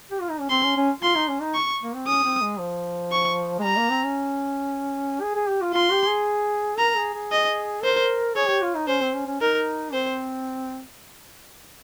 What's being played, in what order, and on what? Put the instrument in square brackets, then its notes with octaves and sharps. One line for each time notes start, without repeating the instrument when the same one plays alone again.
[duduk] G4
F4
D#4
C#4
[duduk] C4 [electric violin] C6
[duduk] C#4
C#4
[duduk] F4 [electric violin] C6
[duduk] D#4
C#4
D#4
[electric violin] C#6
[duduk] A#3
C4
[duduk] C#4 [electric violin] D#6
[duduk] C4
G#3
F3
[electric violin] C#6
[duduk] G#3
[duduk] G3 [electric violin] A#5
[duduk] A#3
C4
C#4
G#4
G#4
G4
F4
[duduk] F4 [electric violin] C6
[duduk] G4
G#4
[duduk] A#4 [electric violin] A#5
[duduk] G#4
G#4
[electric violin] D#5
[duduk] A#4 [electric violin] C5
[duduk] G#4 [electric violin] C#5
[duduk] G4
F4
D#4
[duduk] C#4 [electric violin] C5
[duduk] C4
C#4
C#4
[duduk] D#4 [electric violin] A#4
[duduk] C4 [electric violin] C5